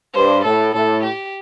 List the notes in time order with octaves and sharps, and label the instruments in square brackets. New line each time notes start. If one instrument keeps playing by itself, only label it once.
[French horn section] G2 [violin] C5
[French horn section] A2 [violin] A4
[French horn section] A2 [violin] A4
[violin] G4